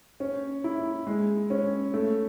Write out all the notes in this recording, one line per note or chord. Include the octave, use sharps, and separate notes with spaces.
C#4
E4
G#3
C#4
A3